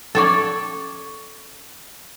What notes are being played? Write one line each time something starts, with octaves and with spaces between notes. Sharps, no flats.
C#4 A4 C#5 D5 C#6